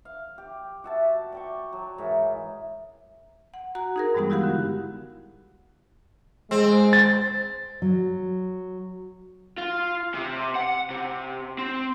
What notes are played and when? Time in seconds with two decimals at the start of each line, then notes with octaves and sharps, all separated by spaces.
0.05 F5
0.38 G4
0.84 F#4 E5 A5
1.32 D5 G5 C#6
1.73 F#3
1.98 G#2 E3 A#4 E5
3.54 F#5
3.75 F#4 F#5 A#5
3.96 D#4 G#4 A#4
4.14 G2 E3 G3 G#3 B3 D#4
4.30 E4 F#4 G4 F5 F#5
4.44 D3
6.51 G#3 C4
6.93 A6
7.82 F#3
9.58 F4
10.14 C3
10.55 F#5
10.90 C3
11.59 C4